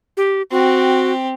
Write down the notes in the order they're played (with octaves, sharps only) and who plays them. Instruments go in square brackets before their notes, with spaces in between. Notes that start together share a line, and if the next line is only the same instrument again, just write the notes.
[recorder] G4
[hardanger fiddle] C4 G4 [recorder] F#4